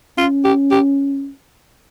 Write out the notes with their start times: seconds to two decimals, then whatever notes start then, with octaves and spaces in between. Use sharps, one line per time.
0.18 C#4 F4
0.44 G4
0.71 G4